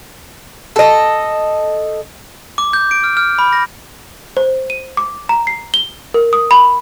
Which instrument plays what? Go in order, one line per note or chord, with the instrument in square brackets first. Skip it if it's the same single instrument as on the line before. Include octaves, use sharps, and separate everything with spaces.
[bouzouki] A4 D#5
[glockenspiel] D6
G6
D7
F6
F6
B5
A#6
[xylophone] C5
D#7
D6
A#5
C7
G7
A#4
D#6
B5